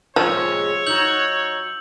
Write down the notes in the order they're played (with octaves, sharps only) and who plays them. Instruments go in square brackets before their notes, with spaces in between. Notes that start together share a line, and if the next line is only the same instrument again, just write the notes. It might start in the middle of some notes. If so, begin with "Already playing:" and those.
[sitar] A2 C3 G#3 [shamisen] F3 [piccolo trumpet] C#5 [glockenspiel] E6
[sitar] D#4 F#4 [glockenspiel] E6 G6 F#7